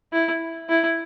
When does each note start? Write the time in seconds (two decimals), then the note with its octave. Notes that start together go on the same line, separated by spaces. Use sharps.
0.13 E4
0.69 E4